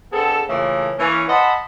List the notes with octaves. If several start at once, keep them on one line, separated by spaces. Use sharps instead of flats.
D3 B3 C4 G#4 A4
A#2 C#3 E3 A3
E3 A#3 C#4
C5 D#5 E5 F#5 A5 B5